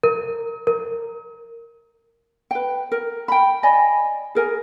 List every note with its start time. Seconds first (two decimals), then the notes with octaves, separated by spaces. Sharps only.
0.03 A#4
0.67 A#4
2.51 B4 G5
2.92 A#4
3.28 G5 B5
3.63 D5 D#5 G#5 B5
4.35 G#4 A#4 G#5